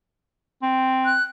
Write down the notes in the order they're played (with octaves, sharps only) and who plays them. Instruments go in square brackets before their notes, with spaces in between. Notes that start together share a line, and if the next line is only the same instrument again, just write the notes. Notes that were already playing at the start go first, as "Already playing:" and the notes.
[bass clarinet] C4
[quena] F#6